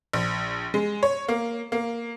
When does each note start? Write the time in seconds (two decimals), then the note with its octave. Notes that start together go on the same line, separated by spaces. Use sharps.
0.13 A#1
0.74 G#3
1.03 C#5
1.28 A#3
1.72 A#3